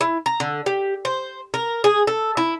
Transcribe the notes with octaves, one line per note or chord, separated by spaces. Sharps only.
E4
A#5
D3
G4
C5
A#4
G#4
A4
E4